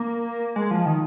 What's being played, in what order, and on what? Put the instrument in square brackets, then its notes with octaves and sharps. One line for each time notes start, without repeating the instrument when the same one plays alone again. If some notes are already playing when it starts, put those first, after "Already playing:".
Already playing: [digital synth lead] A#3
G#3
F3
D#3